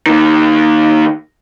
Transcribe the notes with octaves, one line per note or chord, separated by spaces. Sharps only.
D#3 A#3